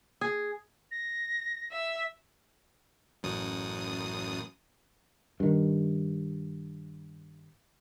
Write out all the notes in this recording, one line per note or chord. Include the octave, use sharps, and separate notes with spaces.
G#4
A#6
E5
A1 F#2 D#6
G2 D#3